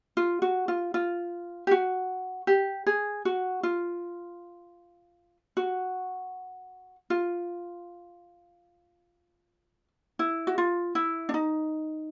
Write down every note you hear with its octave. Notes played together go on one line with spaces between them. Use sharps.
F4
F#4
F4
F4
G4
F#4
G4
G#4
F#4
F4
F#4
F4
E4
F#4
F4
E4
D4
D#4